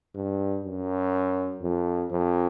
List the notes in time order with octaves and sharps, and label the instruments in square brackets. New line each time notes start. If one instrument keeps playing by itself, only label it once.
[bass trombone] G2
F#2
F2
F2